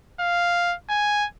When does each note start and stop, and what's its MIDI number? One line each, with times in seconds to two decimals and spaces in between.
0.20 0.75 77
0.89 1.26 80